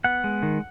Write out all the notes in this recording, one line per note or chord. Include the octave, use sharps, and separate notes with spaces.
B3 F#5
G#3
D#3